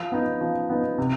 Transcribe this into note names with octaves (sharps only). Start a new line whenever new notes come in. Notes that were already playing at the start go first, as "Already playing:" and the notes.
Already playing: F3
B3 D#4
F3
B3 D#4
C3